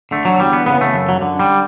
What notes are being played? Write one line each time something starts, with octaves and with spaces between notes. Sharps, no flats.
D3 A3
F#3
E2 G3
B3
C#3 B3
A3
F#2
F#3
D3
G3